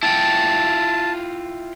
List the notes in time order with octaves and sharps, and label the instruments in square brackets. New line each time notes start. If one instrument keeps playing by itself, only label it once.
[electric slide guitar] E4 F4 G5 [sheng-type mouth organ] A5